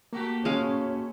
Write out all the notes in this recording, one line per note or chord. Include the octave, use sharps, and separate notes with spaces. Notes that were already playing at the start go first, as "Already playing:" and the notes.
A3 A#3 F#4 G4
G#3 C#4 F5